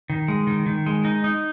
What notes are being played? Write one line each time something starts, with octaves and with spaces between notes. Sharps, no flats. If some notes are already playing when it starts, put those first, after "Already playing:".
D#3
G#3
D#3
D#3
G#3
D#4
D#4